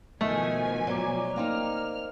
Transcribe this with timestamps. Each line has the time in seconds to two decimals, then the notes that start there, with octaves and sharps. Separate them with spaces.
0.21 B2 D#3 F3 A3 G#5
0.87 F#3 D5 A#5 D6
1.36 A#3 C4 D#4 F6